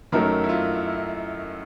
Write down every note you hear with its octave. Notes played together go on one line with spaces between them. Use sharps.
F#2 D#3 F#3 A3 A#4
E4
F4
E4